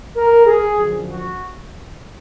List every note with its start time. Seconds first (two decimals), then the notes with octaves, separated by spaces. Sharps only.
0.17 A#4
0.47 G#4
0.78 F#2 D3 F3
1.08 F#4